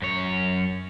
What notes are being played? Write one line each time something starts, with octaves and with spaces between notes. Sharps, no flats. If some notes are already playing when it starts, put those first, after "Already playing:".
F#2 C#5